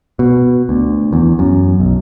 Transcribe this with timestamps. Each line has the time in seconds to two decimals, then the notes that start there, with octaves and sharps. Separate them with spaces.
0.19 B2
0.69 D2
1.13 E2
1.39 F#2
1.80 B1